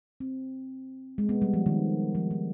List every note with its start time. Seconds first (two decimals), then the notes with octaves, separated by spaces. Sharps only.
0.20 C4
1.18 G#3
1.29 B3
1.42 G3
1.54 F3
1.66 D#3
2.15 F3
2.31 F3